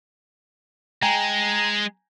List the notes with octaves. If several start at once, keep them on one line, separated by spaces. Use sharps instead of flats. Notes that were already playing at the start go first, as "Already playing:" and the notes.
G#3 G5 G#5 A#5